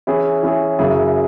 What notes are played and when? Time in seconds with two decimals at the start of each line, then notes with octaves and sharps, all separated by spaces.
0.07 E3 C#4 E4 G#4
0.43 E3 C#4 E4 G#4
0.79 F#2 C#3 F#3 E4 G#4